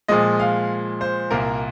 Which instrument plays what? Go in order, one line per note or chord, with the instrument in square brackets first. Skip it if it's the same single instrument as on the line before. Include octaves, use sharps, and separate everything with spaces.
[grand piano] A#2 F3 G#3 D#5
F5
C5
C2 A#2 A#3 A#4